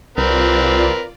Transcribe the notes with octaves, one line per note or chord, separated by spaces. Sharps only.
C2 C4 F4 A#4 B4 D5